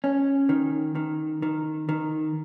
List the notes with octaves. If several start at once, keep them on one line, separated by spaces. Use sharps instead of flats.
C#4
D#3
D#3
D#3
D#3